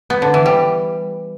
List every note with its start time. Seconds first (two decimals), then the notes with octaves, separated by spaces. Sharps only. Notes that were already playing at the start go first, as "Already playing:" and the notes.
0.10 B3
0.22 D3
0.34 E3
0.46 G3